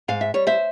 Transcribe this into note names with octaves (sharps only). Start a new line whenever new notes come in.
G#2 F5
E5
G3 C#5
C5 E5